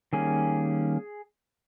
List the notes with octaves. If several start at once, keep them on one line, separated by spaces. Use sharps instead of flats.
D#3 G3 A#3 C#4 G#4